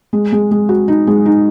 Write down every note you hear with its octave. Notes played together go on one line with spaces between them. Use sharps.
G#3
G#3
G#3
F#4
D#4
G#3
D#4